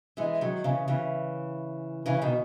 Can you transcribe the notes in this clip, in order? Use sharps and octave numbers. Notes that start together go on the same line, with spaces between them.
E3 G#3
D#3 F#3
C#3 E3
C#3 E3
C#3 E3
B2 D#3